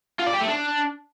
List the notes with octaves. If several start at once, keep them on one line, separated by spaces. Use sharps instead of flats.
F4
D5
G4
A3
D4